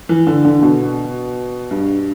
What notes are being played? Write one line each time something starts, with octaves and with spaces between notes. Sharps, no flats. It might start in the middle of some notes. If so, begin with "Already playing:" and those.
E3
D3
D3
B2
G2